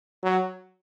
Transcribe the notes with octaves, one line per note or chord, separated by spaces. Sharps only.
F#3